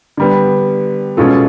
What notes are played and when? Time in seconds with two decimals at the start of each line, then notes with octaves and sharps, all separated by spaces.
0.17 D3 G3 B3
1.17 B2 G#3 C#4 F4 A4